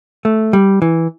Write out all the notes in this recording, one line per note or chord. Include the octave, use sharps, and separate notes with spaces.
A3
G3
E3